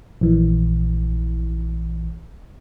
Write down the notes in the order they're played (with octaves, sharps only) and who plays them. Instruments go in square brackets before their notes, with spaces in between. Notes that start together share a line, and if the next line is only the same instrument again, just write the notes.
[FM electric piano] A#1 E3